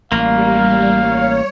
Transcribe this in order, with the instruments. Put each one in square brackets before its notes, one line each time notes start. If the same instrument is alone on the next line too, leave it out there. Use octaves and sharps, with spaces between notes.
[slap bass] A1 [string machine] G3 [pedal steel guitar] A#3 [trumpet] F5
[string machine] C#5